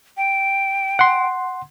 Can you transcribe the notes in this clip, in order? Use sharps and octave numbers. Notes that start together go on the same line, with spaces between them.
G5
F#5 C6